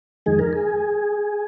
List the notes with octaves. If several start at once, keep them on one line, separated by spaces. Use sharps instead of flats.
F2 D#3 G#3 G#4
A#4
G#4